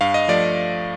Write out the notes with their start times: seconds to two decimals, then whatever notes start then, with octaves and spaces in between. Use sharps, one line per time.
0.01 G2 F5
0.14 D#5
0.28 F3 A3 D5